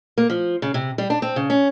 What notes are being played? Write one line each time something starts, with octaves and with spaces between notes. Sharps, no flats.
A#3
F3
C#3
C3
G3
D4
C4
C#3
C#4